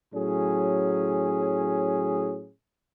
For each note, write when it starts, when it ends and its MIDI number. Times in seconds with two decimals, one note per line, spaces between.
0.14 2.50 45
0.14 2.50 54
0.14 2.50 61
0.14 2.50 68